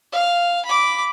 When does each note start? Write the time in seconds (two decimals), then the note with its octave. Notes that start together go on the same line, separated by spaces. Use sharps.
0.13 F5
0.65 B5 D6